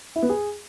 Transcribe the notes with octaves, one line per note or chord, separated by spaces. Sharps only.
E4
B3
G#4